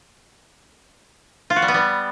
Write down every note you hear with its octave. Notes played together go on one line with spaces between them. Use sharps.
F4
F#4
G3
B3
G3